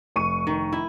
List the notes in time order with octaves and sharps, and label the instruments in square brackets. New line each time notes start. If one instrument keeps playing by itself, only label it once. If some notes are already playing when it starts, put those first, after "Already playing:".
[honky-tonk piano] F1 C#6 D#7
[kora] D#3
E4